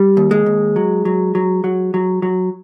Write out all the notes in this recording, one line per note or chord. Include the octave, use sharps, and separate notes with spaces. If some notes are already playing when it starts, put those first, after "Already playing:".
Already playing: G3
D#2
G#3
D#2
F#3
F#3
F#3
F#3
F#3
F#3